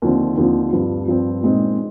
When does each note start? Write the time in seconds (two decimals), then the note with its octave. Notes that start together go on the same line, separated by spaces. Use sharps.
0.02 D#2 D3 F3 C4
0.37 D#2 D3 F3 C4
0.73 G2 F3 C4
1.08 G2 F3 C4
1.42 A#2 G#3 C4 D#4